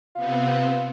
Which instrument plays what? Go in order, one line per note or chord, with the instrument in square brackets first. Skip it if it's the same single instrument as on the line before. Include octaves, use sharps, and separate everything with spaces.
[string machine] C3 B3 C4 [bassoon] F4